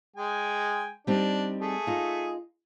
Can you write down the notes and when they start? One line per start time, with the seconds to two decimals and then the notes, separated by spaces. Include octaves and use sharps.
0.16 G#3 G5 G#5
1.07 G3 C4 D4 D#4
1.61 A3 G#4
1.87 D#4 F4